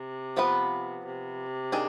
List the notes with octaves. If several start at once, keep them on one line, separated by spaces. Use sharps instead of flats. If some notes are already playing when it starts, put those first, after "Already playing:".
Already playing: C3
F3 B3 F4 B4
C3
D#3 D4 G#4